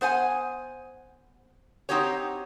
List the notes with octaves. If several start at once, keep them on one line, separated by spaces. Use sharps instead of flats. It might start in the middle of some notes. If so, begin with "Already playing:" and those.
B3 C5 F#5 G#5
C4 D#4 F#4 G4 C#5